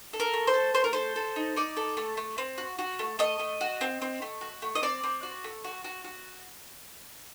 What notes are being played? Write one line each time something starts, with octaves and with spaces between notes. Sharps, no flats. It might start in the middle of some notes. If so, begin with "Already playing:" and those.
A4
A#4
A3
C5
A4
A3 C5
A#4
A4 C5
A4
D#4
D#4 D5
A4
A3
A3
C4
F#4
F#4
A3
A3 D#5
A3
F#4
C4
C4
A3
F#4
A3
D#5
C4 D5
C4
F#4
A3
F#4
F#4
F#4